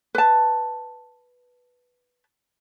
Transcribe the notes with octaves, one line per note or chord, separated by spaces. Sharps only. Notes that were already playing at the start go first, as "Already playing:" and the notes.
B4 A5